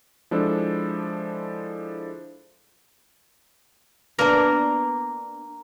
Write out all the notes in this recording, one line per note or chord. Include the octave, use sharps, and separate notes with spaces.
F3 G#3 D4 E4 A4 C5
A#3 B3 D4 A#4